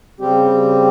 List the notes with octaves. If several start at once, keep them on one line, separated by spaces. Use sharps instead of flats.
C#3 G3 C4 G4